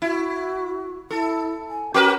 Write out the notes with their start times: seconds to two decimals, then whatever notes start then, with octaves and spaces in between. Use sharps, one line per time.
0.02 E4 F#4
1.10 E4 A4
1.69 G#5
1.94 C#4 F#4 A#4 B4